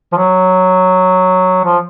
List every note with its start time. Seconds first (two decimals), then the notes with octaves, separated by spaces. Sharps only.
0.12 F3
0.17 F#3
1.65 F3